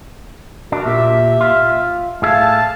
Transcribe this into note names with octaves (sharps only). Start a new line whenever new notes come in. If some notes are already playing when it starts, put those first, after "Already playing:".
D4 F#4 A#4
A#2 G4 E5
F4
A2 G#4 E5 F5 A5